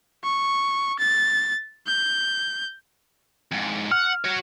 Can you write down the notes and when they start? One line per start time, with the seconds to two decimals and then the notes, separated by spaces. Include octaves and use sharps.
0.24 C#6
0.99 A6
1.87 G6
3.52 F2 G#2
3.92 F#5 F6
4.24 F#4 C#5